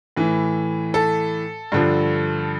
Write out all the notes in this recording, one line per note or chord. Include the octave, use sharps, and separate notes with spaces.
A2 E3
A4
G2 D3 F3